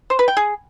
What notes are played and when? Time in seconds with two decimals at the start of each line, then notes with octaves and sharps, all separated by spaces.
0.10 C5
0.19 B4
0.28 G5
0.37 G#4